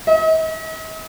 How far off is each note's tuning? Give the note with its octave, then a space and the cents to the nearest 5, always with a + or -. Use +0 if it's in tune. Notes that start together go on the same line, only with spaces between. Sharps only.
D#5 +45